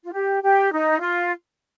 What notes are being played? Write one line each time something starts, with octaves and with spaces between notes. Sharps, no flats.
F4
G4
G4
D#4
F4